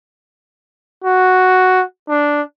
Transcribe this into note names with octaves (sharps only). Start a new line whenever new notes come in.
F#4
D4